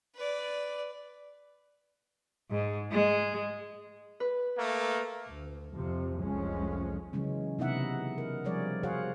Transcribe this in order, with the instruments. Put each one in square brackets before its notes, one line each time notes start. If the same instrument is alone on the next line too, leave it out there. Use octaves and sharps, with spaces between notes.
[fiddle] B4 D5
[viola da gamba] G#2
G#3
[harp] B4
[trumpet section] A3 A#3
[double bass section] D2
F2 C3 F3
F1 C2 F3 G#3 A3 C#4
[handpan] C#3 E3 F#3 G#3 C#4
C3 B3 D#4 E4 E5 F#5
A#4
F3 G3 G#4 C#5 D5
F#4 G#4 C5 C#5 F5 F#5